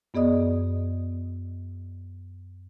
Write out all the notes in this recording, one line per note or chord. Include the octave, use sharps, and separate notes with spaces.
F#2 B3 G#4 D5 D#5 D#6